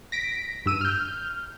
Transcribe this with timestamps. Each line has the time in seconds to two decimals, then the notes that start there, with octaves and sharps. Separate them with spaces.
0.12 A#6 B6 D7
0.66 G2 E6 D#7
0.81 F6 G6